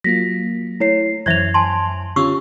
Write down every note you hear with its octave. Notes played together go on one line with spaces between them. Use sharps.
F#3 A#3 F4 A#6 B6
A3 E4 C#5 C7
F#2 E3 C5 C#5 E5 G#6 F7
G#5 A5 C6
D3 C#4 F4 G4 C#6 E6